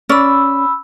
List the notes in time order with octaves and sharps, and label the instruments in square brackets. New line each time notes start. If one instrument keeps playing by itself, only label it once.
[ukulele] C#4 D5 [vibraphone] B5 E6